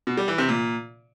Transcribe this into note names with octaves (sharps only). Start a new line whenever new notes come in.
B2
G3
E3
C3
A#2